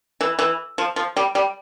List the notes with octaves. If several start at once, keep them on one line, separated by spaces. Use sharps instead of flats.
E3
E3
F3
F3
G3
G3